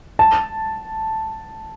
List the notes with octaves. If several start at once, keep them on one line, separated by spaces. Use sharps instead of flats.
A5